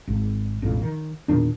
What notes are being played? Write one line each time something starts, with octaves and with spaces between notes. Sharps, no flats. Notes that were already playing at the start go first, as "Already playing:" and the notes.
G#1
E1 A1 F2
D#3
E2 A#2 D#3 D4